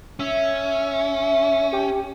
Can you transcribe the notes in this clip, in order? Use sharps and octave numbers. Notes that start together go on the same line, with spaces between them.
C#4 E5
G4